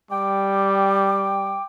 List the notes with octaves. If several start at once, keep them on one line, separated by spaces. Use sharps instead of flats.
G3 G5 D6